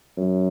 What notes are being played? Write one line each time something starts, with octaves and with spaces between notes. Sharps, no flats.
F#2